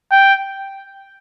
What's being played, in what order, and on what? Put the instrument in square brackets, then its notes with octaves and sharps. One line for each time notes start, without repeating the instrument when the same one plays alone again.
[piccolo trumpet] G5